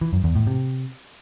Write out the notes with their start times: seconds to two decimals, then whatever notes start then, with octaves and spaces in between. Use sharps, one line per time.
0.01 E3
0.13 F#2
0.24 E2
0.35 A2
0.47 C3